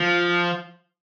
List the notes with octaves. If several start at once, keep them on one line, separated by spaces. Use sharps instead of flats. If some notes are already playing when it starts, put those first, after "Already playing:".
Already playing: F3